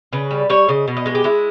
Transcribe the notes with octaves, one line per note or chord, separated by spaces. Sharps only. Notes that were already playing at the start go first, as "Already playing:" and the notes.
C#3 B4
G3
G3 C#5
C#3 D#5
B2
D#5
G#3 G#4
G4
G#3 E4